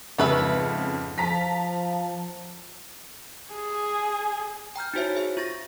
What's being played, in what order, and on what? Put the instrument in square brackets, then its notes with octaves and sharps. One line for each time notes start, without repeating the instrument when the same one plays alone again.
[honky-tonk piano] F2 G#2 C#3 [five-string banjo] B3 B4 E5
[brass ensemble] F3 [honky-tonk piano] A5 A#5 B6
[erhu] G#4
[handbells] G5 A#5 F6 G6
D#4 E4 F#4 C5 C#5 E5
G#4 E5
F4 C#6 A6 A#6